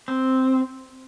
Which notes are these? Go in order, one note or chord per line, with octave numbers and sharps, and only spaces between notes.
C4